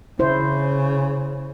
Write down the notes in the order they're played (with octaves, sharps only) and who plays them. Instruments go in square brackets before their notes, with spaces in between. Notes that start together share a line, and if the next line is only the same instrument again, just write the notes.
[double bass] C#3 [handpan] E4 C5